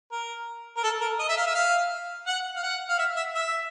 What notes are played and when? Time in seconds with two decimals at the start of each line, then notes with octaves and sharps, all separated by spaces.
0.11 A#4
0.77 A#4
0.83 A4
1.01 A#4
1.19 D#5
1.28 E5
1.37 F5
1.46 E5
1.55 F5
2.27 F#5
2.56 F5
2.63 F#5
2.89 F5
2.98 E5
3.16 E5
3.35 E5